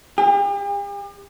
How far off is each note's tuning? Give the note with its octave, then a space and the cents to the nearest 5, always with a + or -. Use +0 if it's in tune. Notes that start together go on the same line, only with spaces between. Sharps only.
G4 +45